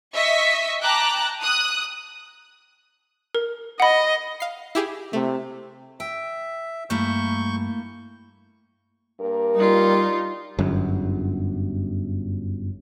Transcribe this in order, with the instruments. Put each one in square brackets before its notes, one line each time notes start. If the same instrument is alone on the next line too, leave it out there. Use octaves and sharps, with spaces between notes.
[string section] D#5 E5 C#6 B6
G5 A5 A#5 D6 F#6
D#6 F#6
[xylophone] A#4
[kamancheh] D#5 [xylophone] F#5 B5
[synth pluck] F5 C7
E4 G4 G#4
[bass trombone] C3 [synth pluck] A3
[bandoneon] E5 [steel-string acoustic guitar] G5
[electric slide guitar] G2 [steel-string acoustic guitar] A3 A#3 E4 [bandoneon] C#6 G6
[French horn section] G2 A#3 A#4
[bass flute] G3 [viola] D#4 F4
[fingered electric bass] G1 F#2